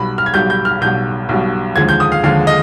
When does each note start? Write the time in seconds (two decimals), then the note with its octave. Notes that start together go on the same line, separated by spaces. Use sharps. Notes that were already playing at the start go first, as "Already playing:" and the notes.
Already playing: B1 B2 G3 B5
0.18 F6
0.26 G#6
0.34 B1 B2 G3 G6
0.50 G6
0.65 F6
0.81 B1 B2 G3 G6
1.29 B1 B2 G3
1.76 D#2 D3 F3 G#3 G#6
1.89 G6
2.00 D#6
2.12 F5
2.23 D#2 D3 F3 G#3 F5
2.47 D#5